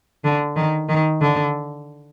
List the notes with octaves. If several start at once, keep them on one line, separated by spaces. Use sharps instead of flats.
D3
D#3
D#3
D3